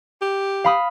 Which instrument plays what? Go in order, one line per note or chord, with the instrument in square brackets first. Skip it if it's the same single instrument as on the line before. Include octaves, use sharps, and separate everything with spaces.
[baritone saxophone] G4
[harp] F5 B5 D#6